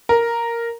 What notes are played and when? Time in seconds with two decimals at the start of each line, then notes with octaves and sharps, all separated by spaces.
0.09 A#4